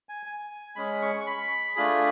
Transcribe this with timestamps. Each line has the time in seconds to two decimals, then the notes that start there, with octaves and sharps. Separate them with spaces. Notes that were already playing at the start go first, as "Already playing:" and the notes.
0.09 G#5
0.26 G#5
0.76 G#3 C#4 G#4 B5
1.02 C#6
1.20 C#6
1.27 B5
1.76 A3 D4 F4 G#4 B5